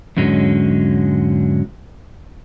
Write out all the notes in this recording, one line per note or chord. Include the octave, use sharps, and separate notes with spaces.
E2 G#2 D3 F#3 G#3 C#4